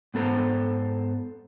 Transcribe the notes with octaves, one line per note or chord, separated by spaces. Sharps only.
G#2 B3 A4 C5 A#5